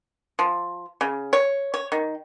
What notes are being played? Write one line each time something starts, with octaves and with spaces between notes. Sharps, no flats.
F3
C#3
C#5
C#5
D#3